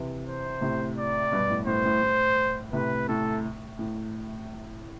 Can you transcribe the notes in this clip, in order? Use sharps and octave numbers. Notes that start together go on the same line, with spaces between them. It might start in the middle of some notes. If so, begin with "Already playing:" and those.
Already playing: C3 E3
C5
A2 C3
D5
G2 B2
A2
A2 C5
A2
A2
A2 C3 B4
A2 A4
A2